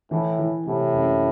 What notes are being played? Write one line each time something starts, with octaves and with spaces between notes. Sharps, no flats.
A2 E3
E3
A2 C3
F#1